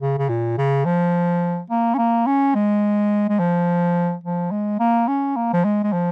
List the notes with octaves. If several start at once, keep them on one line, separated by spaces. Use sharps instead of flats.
C#3
C#3
A#2
C#3
F3
A#3
C#4
A#3
C#4
G#3
G#3
F3
F3
G#3
A#3
C#4
A#3
F3
G#3
G#3
F3